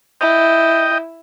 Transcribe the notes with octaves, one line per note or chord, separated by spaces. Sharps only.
E4 D#5 G5